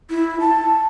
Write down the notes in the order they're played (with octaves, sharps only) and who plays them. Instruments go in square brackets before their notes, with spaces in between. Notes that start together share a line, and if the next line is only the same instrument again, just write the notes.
[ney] E4
A5